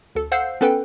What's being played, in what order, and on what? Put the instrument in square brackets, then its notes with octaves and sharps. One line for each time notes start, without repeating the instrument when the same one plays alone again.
[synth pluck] D2 A4
C5 F5 F#5 E6 G6 C7
B3 C#4 A4 B4 G5